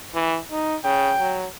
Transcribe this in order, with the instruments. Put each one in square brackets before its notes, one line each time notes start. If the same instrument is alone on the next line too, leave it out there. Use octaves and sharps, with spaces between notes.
[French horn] E3
D#4
[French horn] C#3 [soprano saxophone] G5
[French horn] F#3